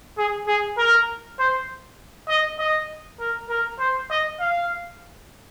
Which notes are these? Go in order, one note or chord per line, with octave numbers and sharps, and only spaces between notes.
G#4
G#4
A#4
C5
D#5
D#5
A#4
A#4
C5
D#5
F5